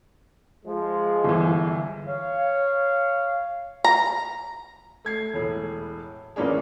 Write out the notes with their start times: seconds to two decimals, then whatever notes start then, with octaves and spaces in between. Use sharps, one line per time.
0.66 F3 G#3
1.24 G1 E3
2.07 C#5 F5
3.84 A#5
5.05 A3 G#6 C7
5.34 E1 A2
6.36 A1 E3 A#3 C#4 D4 G#4